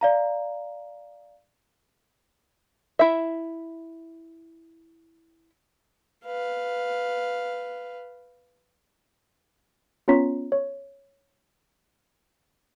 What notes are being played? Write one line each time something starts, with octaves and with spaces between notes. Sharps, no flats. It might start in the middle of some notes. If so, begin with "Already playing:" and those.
D5 F5 A#5
E4 E5
B4 F5
B3 C#4 F4 C#5 A#5 B6
C#5